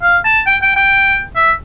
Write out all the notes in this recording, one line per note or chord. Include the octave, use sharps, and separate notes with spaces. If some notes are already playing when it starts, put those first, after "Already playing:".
F5
A5
G5
G5
G5
E5